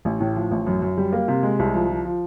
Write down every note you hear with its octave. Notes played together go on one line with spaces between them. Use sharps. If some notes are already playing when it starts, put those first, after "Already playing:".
A1
A2
F3
A1
F#2
F#2
G3
A#3
C3
G#3
C2
F3
F3
F3